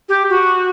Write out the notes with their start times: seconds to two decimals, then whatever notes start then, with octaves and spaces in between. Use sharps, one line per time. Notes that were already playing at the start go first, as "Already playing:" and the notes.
0.09 G4
0.30 F#4